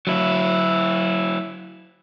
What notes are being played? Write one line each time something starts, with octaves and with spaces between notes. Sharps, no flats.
F#3 E4